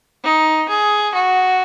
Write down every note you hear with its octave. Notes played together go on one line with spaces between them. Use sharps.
D#4
G#4
F#4